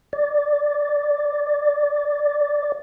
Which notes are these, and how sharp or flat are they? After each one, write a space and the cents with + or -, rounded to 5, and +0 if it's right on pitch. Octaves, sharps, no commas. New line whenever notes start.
D5 -5